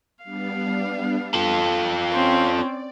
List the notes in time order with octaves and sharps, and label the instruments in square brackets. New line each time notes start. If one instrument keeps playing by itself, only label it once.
[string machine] G3 B3 D4 [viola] F5
[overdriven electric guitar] F4 A4 [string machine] G5 D6
[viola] C4 C#4 [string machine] D5